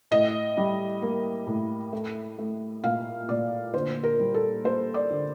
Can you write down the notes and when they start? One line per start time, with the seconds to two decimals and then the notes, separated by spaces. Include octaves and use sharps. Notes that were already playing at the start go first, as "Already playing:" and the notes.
0.11 A2 D#5
0.57 G3
1.02 A#3
1.47 A2
1.93 A3
2.38 A3
2.83 A#2 F5
3.28 A#2 D5
3.73 D3 C5
4.03 A#4
4.19 G3
4.34 A4
4.64 A#3 C5
4.94 D5
5.10 D3